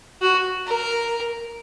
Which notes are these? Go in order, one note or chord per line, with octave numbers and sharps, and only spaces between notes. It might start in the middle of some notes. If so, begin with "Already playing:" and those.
F#4
A#4